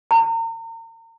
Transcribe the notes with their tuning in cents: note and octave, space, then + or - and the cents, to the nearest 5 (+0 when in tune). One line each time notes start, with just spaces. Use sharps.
A#5 -40